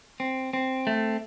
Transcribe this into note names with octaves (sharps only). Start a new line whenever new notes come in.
C4
C4
A3